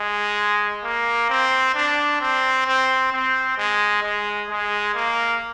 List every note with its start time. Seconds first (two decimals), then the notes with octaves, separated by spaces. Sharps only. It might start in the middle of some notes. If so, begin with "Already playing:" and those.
Already playing: G#3
0.84 A#3
1.30 C4
1.74 D4
2.20 C4
2.66 C4
3.12 C4
3.57 G#3
4.03 G#3
4.49 G#3
4.94 A#3